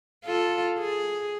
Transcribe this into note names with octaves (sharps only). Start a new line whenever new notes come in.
F4 A4
G#4